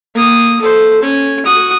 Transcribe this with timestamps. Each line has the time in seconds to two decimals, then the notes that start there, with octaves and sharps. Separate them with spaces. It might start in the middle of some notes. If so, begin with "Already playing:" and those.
0.15 A#3 D#6
0.62 A4 C5
1.03 C#4
1.45 F#4 D#6